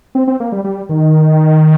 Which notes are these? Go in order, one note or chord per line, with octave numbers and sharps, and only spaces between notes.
C4
C4
A#3
G3
G3
D#3